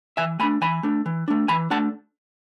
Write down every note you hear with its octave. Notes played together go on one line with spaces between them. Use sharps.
E3 E5 G#5
A3 D4 G#5 B5
E3 G#5 B5
A3 D4
E3
A3 D4
E3 G#5 B5
A3 D4 F#5 A5